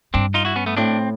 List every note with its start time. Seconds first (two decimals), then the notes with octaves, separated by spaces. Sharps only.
0.14 G2 C4 D4
0.34 D#4 F4
0.45 E4 F#4
0.56 B3 C#4
0.66 A3 B3
0.77 A2 C4 D4